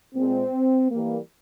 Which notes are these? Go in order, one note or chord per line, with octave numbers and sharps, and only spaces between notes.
A#2 G#3 C4
E3 G3 A#3